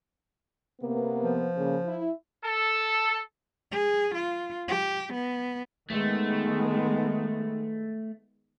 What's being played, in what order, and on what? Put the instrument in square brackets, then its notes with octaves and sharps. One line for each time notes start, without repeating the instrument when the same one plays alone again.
[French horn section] C3 A#3 B3
[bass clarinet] F3
[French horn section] C#3 A#3
E4
[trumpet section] A4
[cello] G#4
F4
G4
B3
[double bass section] D#3 G#3 B3 [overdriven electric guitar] A3